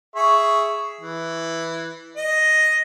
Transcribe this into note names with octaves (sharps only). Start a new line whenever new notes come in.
G#4 E5 C#6
E3
D#5